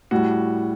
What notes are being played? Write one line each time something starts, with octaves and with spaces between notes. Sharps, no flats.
A2 G3 F#4